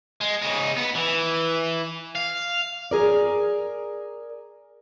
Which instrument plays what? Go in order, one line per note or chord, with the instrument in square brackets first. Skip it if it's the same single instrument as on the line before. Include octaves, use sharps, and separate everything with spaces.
[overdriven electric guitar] G#3
C#3 D#4
B3
E3
F5
[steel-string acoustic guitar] G#4 A#4 D5